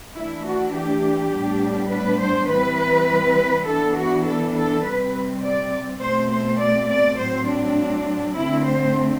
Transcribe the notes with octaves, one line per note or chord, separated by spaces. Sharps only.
E3 A3 D4 E4
F#4
G4
A2 G3 B3 D4
B4
C5
E3 G3 C4 B4
E3 B3 D4 A4
F#4
A4
A4
C3 G3 C4 B4
D5
B2 A3 C4 C5
C5
D5
D5
A2 F#3 C4 C5
D4
D3 A3 C4 E4
C5